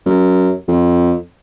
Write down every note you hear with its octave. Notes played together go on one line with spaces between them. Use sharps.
F#2
F2